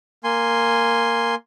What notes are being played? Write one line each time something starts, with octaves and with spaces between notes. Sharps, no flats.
A#3 G#5 C6